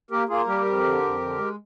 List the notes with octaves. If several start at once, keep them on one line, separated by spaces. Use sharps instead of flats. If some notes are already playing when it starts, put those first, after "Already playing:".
A#3 G4 A#4
A#3 F4 G#4
G3 G4 A#4
F2
D3
F2
D3
G#3